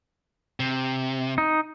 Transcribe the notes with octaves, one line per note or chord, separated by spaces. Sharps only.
C3
D#4